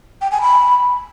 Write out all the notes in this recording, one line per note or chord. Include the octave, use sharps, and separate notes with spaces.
G5
G#5
B5